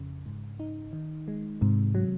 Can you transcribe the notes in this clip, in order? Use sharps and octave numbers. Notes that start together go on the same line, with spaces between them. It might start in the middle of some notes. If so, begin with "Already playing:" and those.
Already playing: F2 C#3
G#2
D#4
D#3
G#3
G#2 C3
F#3